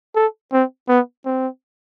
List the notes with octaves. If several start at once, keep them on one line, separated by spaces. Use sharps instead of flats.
A4
C4
B3
C4